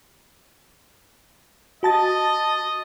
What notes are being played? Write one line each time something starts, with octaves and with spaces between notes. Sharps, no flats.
F#4 D#5 A5 A6